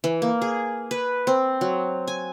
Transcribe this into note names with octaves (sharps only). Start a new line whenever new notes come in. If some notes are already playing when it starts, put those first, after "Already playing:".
E3
A#3
G#4
B4
C4
F#3
G#5